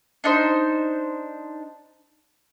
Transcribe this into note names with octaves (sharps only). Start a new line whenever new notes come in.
D4 D#4 C5